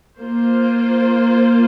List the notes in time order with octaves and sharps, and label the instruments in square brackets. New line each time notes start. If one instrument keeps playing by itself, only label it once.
[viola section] A#3 F4 C5